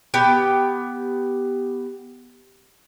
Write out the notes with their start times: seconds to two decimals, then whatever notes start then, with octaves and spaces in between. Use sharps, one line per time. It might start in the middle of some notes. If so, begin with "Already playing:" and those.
0.14 B3 G4 G5